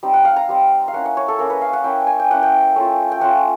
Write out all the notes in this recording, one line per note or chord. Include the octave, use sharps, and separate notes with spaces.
G3 C4 D#4
F#5
F5
A#5
G3 C4 D#4
F5
A#3 C#4 E4 F#5
F#5
C#5
A4
A#3 C#4 E4 A#4
B4
F5
F#5
A#3 C#4 E4 G5
G#5
G5
A#3 C#4 E4 F#5
G5
A3 C#4 F4
G5
A3 C#4 F4 F#5